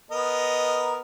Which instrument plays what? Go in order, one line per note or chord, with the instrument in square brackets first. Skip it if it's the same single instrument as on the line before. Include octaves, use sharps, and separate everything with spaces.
[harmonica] B3 A#4 D#5